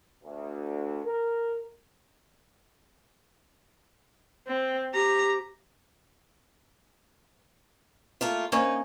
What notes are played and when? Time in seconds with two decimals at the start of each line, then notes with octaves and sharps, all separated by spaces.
0.24 D2
1.05 A#4
4.47 C4
4.94 G4 A#5
8.21 A3 A#3 F4
8.52 A#3 C#4 D#4 C#5